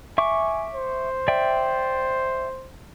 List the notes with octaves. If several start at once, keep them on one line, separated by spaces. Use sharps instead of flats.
E5 G#5 C#6 D6
C5
D5 E5 G5